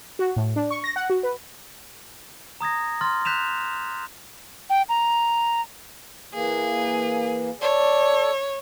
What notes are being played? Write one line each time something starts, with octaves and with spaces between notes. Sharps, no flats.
F#4
A2
D4
C#6
A#6
F#5
F#4
B4
A#5 D#6 G#6 A#6
C6 F6 A6
F#6 G6 B6 E7 F7
G5
A#5
E3 A#3 G#4
A4 C#5 D5